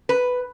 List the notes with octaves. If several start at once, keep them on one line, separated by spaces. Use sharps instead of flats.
B4